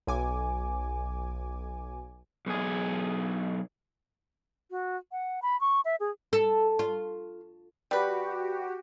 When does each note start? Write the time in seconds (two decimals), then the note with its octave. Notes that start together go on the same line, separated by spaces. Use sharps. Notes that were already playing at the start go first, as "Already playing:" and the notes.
0.07 B1 G#5 D6
2.46 B1 G#4
4.71 F#4
5.12 F#5
5.42 B5
5.61 C#6
5.85 E5
6.00 G#4
6.33 A4
6.79 F4
7.91 G3 F#4 G4 B4